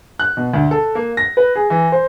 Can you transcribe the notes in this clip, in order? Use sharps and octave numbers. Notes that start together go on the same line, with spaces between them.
F#6
B2
D2
A4
A#3
A#6
B4
G#4
E3
C5